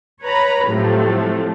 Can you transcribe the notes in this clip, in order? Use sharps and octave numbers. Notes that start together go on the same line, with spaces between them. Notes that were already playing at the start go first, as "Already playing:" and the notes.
B4 C#5 A#5 B5
A2 C3 F3 F#3 A3